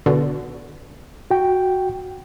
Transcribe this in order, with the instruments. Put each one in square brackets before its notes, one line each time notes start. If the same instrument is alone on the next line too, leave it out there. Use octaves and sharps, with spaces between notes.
[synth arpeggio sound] B2 D3
[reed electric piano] F#4 G5